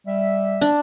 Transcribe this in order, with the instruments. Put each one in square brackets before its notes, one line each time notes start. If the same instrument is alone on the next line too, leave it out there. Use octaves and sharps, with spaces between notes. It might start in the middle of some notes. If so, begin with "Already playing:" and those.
[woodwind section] G3 E5
[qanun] D4